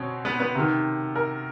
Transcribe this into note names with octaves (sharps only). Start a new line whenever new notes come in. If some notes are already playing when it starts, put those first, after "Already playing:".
Already playing: B2 C4 C#4
B3 B4
B3 B4
C3 D#3
A#4